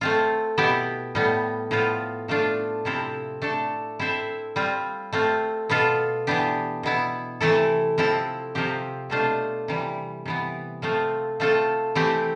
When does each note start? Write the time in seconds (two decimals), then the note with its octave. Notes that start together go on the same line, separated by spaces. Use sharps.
0.01 A3 C4 F4
0.58 B2 B3 E4 G4
1.15 A2 G3 B3
1.71 A2 F3 B3 F4
2.28 F3 A3 D4 F4
2.85 C3 F3 C4 E4 A4
3.42 A3 D4 A4
3.99 C4 E4 A4 C5 E5
4.56 G3 C4 F4
5.13 A3 C4 F4
5.69 B2 B3 F4 A4
6.27 E3 B3 D4 G4
6.83 B2 B3 E4
7.40 C3 E3 A3 E4 A4
7.98 F3 C4 E4 A4
8.55 C3 F3 C4 G4
9.10 B2 A3 D4 F4 C5
9.68 C3 E3 G3
10.25 C3 E3 B3
10.82 F3 A3 C4 F4
11.40 A3 C4 F4 A4
11.95 E3 A3 C4 G4